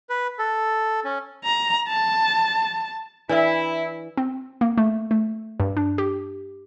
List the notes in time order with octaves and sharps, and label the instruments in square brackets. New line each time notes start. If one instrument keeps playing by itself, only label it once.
[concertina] B4
A4
C#4
[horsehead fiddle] A#5
A5
[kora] E3 [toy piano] D4 D5 E5 [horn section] E4
[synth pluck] C4
A#3
A3
A3
G2
D4
G4